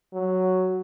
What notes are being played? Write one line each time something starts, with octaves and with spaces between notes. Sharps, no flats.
F#3